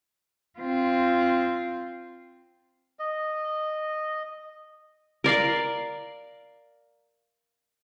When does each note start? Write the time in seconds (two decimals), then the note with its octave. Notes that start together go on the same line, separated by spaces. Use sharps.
0.59 C4 F4
2.99 D#5
5.24 A#4 D5 F5